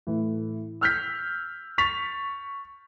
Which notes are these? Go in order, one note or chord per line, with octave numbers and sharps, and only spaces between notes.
A2 E3
E6 F6 G6 B6
C#6 A6 B6 F7